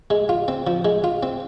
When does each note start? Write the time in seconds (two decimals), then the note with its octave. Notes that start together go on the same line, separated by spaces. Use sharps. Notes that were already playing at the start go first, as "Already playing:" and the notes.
0.10 G#3
0.29 F4
0.48 C4
0.67 F3
0.85 G#3
1.04 F4
1.23 C4